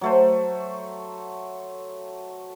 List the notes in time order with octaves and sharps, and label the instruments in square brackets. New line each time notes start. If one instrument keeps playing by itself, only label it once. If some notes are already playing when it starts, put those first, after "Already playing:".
[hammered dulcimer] F#3 A3 C5